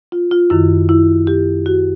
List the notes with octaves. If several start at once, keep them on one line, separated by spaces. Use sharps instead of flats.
F4
F4
F#2 D#3 E4
E4
G4
F#4